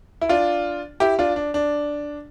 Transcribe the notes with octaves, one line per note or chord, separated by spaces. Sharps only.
E4
D4 F4
E4 G4
D4 F4
D4
D4